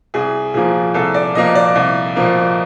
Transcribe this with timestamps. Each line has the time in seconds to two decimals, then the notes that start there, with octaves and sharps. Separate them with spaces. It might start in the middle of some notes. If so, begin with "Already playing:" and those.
0.14 C2 G#4
0.54 A#2 F3 A#3 G#4
0.94 C2 A4
1.14 D5
1.35 A#2 F3 A#3 D#5
1.55 D5
1.75 C2
2.16 A#2 F3 A#3